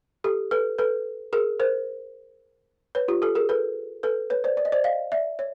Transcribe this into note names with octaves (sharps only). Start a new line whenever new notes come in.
G4 A4
A4 B4
A4 B4
G#4 A#4
A#4 C5
B4 C#5
F4 G4
G4 A4
G#4 A#4
A4 B4
A4 B4
B4 C#5
C5 D5
D5
D#5
C5 D5
D#5 F5
D5 E5
C#5